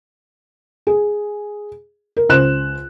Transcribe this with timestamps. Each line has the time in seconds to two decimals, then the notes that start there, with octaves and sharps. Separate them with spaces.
0.87 G#4
2.17 A#4
2.29 C#2 C5 F#6 E7